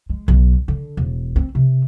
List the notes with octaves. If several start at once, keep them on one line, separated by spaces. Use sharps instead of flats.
G#3
B1
D3
E1
C4
C3